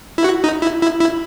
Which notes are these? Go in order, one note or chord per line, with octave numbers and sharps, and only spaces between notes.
E4
F#4
D#4
E4
E4
E4